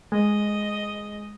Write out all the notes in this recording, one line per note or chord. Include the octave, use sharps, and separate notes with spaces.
G#3 D#5